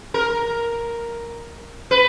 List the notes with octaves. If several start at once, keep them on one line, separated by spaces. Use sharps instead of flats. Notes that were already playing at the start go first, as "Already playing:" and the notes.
A#4
B4